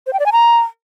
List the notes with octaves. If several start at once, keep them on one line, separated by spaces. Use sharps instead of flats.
C5
G5
D5
G#5
A#5